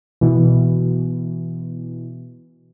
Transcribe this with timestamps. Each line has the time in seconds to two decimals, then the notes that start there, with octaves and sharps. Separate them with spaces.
0.21 B2 E3